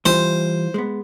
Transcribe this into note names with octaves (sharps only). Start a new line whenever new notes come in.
E3 G3 F4 C5
G#3 B3